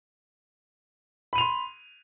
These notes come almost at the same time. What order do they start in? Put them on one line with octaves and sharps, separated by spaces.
B5 D#7 F7 C6